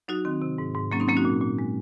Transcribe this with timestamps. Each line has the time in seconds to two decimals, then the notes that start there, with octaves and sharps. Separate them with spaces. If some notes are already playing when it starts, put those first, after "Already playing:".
0.08 F#3 D#4 F#4
0.25 D#3 C4
0.42 C3
0.58 G#2
0.75 G#2
0.92 F#3 A#3 C#4
1.00 C4 D#4
1.08 F#3 A#3 C#4
1.17 D#4 F#4
1.25 A#2
1.42 A#2
1.59 G#3